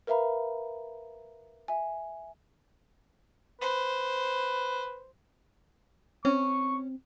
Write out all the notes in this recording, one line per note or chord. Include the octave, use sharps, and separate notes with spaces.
A#4 B4 E5 F5 A#5 B5
E5 G#5
B4 C5
C4 C#4 C#6